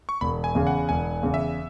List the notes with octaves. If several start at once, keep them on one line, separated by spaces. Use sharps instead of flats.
C#6
E1 B5
G#5
E2 C#3
F#5
E1 G#5
E2 C#3
E5